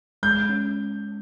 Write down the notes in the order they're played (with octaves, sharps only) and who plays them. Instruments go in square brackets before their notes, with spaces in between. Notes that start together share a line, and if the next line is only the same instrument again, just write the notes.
[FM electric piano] G#3 [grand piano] G6
[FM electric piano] C#4